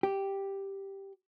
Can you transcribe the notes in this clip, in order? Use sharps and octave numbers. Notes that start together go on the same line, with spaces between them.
G4